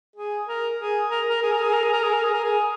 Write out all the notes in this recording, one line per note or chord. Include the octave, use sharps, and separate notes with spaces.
G#4
A#4
G#4
A#4
A#4
G#4
A#4
G#4
A#4
G#4
A#4
G#4
A#4
G#4
A#4
G#4